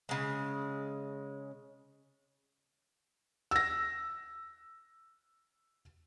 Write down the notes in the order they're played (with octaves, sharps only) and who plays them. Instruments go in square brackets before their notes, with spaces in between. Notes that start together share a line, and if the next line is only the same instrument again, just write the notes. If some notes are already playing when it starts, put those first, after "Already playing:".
[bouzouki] C#3 G#3
[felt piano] E6 A#6